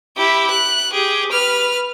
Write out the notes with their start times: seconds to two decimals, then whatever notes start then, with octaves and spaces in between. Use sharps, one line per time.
0.17 E4 G4
0.51 F#6
0.92 G4 G#4
1.31 B4 F6